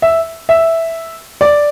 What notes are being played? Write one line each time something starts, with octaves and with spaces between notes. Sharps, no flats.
E5
E5
D5